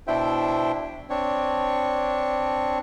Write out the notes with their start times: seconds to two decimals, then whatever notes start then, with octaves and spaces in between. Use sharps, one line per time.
0.07 B2 D4 E4 C5 E5 G5
1.10 C4 D4 C#5